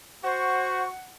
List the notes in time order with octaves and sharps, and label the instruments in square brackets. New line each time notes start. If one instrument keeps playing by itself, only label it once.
[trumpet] F#4 [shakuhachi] C5 [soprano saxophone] F#5 [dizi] C#6